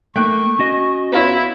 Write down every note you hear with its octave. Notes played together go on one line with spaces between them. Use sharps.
A3 A#3 G5 C#6 F#6
C#4 F#4 D#5
B3 E4 F4 C#5